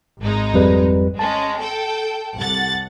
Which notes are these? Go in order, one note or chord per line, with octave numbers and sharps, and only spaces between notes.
G#1 G#3 D#4
F2 G3 B4
G#3 C#4 A5
A4 G5
C2 F#5 A6